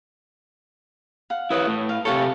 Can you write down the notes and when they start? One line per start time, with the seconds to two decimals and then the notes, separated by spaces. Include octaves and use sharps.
1.30 F5 F#5
1.50 E4 B4 C#5 D#6
1.67 A2
1.89 F5
2.05 C3 G4 A4 C#5 F5 A5